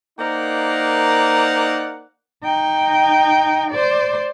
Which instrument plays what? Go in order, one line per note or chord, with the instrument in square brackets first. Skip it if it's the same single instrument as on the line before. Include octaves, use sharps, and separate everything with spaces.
[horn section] A#3 D#4 A#4 C5 D5 F#5
[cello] D#4 G5
C5 D5